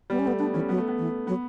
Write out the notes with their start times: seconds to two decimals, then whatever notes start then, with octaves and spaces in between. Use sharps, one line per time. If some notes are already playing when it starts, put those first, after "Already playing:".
0.10 G3 B3
0.19 C#4
0.24 A3 B3
0.39 B3 D4
0.54 E3 C#4
0.69 F#3 B3
0.78 A3
0.88 B3
0.98 E3
1.27 F#3 B3